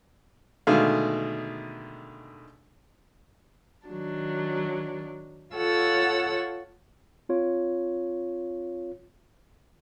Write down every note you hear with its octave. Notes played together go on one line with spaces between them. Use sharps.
B2 D3 D#3 G#3 A3 F5
D#3 F#3 D4
F4 A4 C#5 F#5 E6
C4 F4 C#5